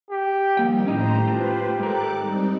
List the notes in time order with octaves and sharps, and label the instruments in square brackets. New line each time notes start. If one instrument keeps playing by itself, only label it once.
[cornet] G4
[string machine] D#3 F3 G3 [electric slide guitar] A#3 G5
[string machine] A2 C5 A#5 [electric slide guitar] C#4 D#4 E4 [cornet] G4
[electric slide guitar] A3 [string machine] F4 B4 C5
[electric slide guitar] G#2 A#4 [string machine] A4 D6 F#6
[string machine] G3 C4 D#4